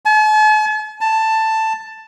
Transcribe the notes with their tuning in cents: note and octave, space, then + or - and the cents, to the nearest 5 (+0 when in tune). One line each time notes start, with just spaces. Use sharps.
A5 -45
A5 +10